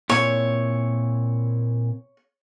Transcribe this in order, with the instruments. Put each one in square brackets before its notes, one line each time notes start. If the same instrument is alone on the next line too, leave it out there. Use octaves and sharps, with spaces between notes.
[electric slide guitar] A#2 C4 E4 [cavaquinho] C#5